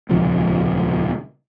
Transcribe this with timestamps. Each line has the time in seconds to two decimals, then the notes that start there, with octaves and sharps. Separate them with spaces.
0.09 D#1 C#2 C3 F3